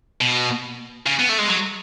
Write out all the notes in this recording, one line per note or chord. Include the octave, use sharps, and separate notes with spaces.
B2
C#3
B3
A3
G#3
F#3